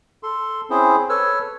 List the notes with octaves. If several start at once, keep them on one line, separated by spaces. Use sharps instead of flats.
A4 C6
C4 C#4 E4 G#4 C5
A4 B4 C#5 E6 F6